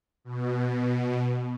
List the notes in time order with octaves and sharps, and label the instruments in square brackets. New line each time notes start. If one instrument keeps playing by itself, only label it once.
[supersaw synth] B2